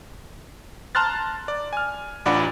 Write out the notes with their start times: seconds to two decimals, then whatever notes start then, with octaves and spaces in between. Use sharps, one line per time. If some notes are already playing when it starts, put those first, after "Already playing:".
0.95 A5 A#5 C6 F6 F#6 A6
1.48 D5
1.73 G#5 F6
2.26 A1 D4 F4 D5 F#5 B5